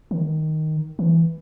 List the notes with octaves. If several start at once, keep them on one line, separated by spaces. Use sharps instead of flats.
D#3
D#3
E3